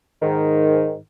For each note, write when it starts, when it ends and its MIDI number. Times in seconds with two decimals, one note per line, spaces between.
0.22 0.96 44
0.22 0.96 51